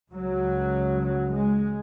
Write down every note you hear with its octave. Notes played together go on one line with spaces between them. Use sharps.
C#2 C#3 F#3
F#3
G#3